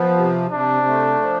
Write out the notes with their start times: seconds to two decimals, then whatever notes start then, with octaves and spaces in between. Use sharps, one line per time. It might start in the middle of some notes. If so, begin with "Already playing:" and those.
Already playing: F3 B3
0.17 C3
0.51 C3 D4
0.86 A3
1.21 F3